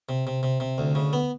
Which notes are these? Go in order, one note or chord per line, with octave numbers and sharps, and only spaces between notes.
C3
C3
C3
C3
D2
C#3
B3